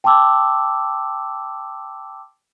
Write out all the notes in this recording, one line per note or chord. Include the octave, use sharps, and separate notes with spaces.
G5 A5 C6 D6 E6